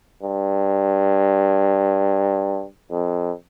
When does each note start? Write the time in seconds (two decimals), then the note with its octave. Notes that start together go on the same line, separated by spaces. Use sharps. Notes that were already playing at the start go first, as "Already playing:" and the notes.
0.22 G2
2.91 F2